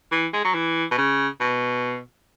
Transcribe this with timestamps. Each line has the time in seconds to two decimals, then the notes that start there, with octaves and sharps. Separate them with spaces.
0.11 E3
0.33 G#3
0.44 F#3
0.54 E3
0.91 B2
0.98 C#3
1.40 B2